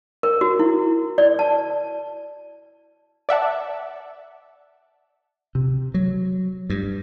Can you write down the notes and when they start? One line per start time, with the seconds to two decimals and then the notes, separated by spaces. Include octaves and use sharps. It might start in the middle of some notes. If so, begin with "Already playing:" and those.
0.23 A#4
0.41 F#4
0.59 E4
1.18 D5
1.39 A5
3.29 D5 E5 F#5 A5
5.55 C3
5.94 F#3
6.70 G2